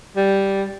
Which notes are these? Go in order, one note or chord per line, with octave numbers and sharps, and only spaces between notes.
G3